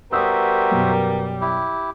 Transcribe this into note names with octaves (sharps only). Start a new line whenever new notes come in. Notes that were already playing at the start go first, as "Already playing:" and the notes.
G3 B3 F#4 A#4 C5 E5 D#6 E6
F#2 B2
E4 G4